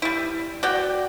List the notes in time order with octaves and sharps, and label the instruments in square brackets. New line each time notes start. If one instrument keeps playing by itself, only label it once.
[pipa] G3 E4
F#4 D5 G5